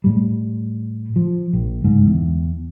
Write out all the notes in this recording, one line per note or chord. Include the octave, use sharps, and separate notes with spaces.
A2 G3
F3
A#1
G1 C#2 G#2
E2